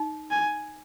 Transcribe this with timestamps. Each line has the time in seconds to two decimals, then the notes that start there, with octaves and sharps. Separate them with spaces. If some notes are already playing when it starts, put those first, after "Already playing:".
Already playing: D#4
0.31 G#5